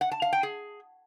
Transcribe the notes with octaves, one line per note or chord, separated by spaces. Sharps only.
F#5
A5
F5
G5
G#4